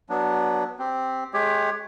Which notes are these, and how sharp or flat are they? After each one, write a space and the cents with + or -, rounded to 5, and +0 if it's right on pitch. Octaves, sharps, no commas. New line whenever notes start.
F#3 +10 B3 -15 D4 +0
C4 +0 G4 +0
G#3 +30 G4 +25 C#5 +0